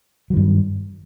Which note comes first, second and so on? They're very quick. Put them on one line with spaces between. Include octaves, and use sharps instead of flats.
F#3 D#3 G2